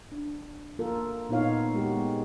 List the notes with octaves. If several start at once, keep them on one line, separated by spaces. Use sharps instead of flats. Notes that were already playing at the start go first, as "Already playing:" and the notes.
D4
A#3 F4 A4 A#4
A#2 B3 D#4 F4 C#5 F5
G#3 F#4 G4
G#3 B3